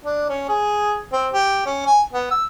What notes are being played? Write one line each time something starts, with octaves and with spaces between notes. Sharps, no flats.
D4
C#4
G#4
C4
G4
C#4
G#5
B3
E6